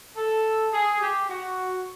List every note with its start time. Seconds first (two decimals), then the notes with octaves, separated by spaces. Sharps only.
0.16 A4
0.73 G#4
1.01 G4
1.29 F#4